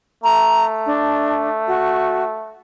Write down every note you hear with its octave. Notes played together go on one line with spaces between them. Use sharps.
A3 A#5
D4
F#4